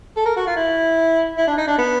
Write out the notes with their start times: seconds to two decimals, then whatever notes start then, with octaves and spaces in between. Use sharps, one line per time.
0.17 A4
0.26 A#4
0.36 F#4
0.47 F4
0.56 E4
1.37 E4
1.47 D4
1.57 D#4
1.68 D4
1.78 B3